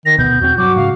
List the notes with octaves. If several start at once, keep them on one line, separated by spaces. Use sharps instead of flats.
D#3 A#6
D2 B2 B3 G6
E2 B2 C4 F#4
G2 F#3 F#4 D6
G#2 C#3 F5